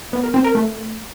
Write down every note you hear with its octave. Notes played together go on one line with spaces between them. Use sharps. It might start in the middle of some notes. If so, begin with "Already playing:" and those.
B3
A#4
C4
A#4
A3